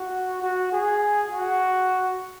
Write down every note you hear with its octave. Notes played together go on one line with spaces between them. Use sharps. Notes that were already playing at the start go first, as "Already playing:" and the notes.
Already playing: F#4
F#4
G#4
F#4